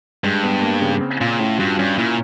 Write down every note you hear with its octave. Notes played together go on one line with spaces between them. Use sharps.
G2 G#3
B3
A#3
C#3
C4
A#2 F4
A2 C#4
G2 F#4
G2 C#4
A#2 E4